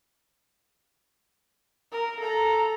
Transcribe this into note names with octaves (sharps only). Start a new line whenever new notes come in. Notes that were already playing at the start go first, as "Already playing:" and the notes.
A#4
A4 A#5